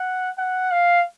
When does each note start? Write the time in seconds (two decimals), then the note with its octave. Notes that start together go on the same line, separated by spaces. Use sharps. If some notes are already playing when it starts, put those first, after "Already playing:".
Already playing: F#5
0.38 F#5
0.71 F5